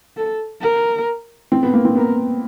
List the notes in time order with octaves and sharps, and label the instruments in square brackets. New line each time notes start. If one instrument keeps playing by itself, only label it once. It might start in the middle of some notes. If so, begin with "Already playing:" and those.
[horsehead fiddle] A4
A#4
[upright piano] C4
B3
A#3
C4
[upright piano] B3 [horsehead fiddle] A#4